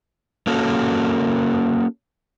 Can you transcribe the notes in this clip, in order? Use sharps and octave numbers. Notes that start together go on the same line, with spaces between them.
A#3 C#4 F#4 A4 A#4